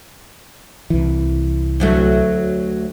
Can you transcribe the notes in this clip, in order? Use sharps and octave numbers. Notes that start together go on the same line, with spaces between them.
C2 E3
D2 F#3 A3